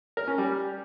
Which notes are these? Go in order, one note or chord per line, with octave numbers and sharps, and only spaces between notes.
A#4
C#4
G3